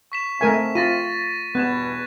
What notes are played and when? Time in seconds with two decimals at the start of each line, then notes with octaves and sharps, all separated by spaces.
0.12 C#6 B6 E7
0.41 A3 C4 A#4 E5 G#5
0.75 F4 A6 A#6 D#7
1.55 E2 G2 B2 B3 F#6 G#6 E7